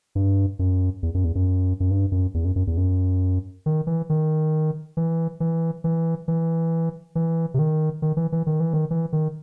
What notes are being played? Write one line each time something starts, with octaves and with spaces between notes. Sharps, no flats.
G2
F#2
E2
F#2
E2
F#2
F#2
G2
F#2
E2
F#2
F#2
E2
F#2
D#3
E3
D#3
E3
E3
E3
E3
E3
C3
D#3
D#3
E3
E3
D#3
E3
D#3
E3
D#3